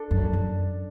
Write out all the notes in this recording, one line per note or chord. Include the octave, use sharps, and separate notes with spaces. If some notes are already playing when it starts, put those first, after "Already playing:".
Already playing: D4 A4
F#2
F#2